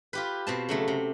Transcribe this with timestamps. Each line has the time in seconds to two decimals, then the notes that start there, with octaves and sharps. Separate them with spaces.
0.13 F4 G4 B4
0.47 B2 C4 A5
0.69 C#3 F#3 A3
0.88 C3